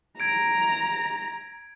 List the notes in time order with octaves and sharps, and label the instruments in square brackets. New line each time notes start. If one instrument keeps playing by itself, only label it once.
[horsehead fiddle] A#5 [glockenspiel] G#6 D7